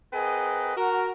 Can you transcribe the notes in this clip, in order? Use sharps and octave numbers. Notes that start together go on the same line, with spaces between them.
C4 G#4 A#4 B4 D#5 F#5
F#4 A#4